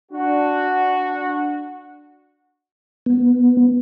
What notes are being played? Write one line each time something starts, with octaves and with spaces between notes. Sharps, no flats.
D4 F#4
B3